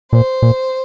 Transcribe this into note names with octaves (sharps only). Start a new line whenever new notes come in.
A#2 C5
A#2